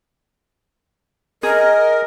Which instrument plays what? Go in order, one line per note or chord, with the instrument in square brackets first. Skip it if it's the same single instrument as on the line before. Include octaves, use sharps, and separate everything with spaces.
[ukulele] G#4 [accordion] A#4 [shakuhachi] D#5